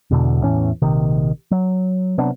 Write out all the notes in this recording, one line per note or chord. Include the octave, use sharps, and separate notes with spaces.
E1 E2 B2 D3
E2 A2 E3 C#4
A#1 C3 D#3
F#3
C3 F#3 B3 D4